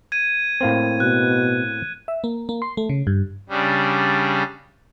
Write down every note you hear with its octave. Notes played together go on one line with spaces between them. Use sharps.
G#6 D#7
A2 A#3 C4
B2 F#6
E5
A#3
A#3
C6
A3
C#3
G2
C#3 G3 D4